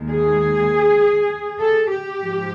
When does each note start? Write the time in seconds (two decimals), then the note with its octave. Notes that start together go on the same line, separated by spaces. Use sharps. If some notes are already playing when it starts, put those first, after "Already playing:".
Already playing: D#2 D#3 G#3
0.09 G#4
1.59 A4
1.89 G4
2.20 G#2 F3 G#3